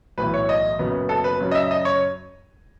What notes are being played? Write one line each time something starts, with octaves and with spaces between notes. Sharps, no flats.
B1 A2 E3 B4
C#5
D#5
F#1 F#2 C#3 F#3 B3
A4
B4
F#2 C#3 F#3
D#5
E5
D#5
C#5